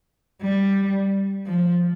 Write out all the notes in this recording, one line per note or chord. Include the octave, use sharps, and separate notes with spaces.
G3
F3